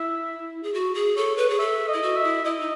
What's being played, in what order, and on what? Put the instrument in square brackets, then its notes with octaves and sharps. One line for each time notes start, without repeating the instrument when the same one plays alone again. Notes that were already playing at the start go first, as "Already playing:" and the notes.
Already playing: [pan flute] E4 [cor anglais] E5
[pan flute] G#4
F#4
G#4
[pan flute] A4 [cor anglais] C#5
[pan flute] B4
G#4
[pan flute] A4 [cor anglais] E5
[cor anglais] D#5
[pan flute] E4
F#4
[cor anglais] E5
[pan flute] E4
[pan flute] E4 [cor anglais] D#5
[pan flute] D#4